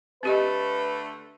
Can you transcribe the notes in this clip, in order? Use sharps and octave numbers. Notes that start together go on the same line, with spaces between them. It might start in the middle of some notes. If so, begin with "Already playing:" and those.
D3 A3 C4 G4 B4 D#5